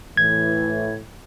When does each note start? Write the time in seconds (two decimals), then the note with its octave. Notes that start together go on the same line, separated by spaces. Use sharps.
0.17 A2 E3 G#6